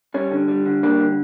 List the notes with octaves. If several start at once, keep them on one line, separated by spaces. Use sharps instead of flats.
G3 C#4
D3
G3
D3
G3 A#3 D4
D3